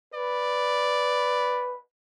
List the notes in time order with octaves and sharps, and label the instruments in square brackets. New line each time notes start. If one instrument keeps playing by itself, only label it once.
[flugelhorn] B4 [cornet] D5